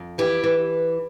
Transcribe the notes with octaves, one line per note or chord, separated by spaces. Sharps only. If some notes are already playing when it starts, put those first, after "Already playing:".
Already playing: F2
E3 E4 G4
E3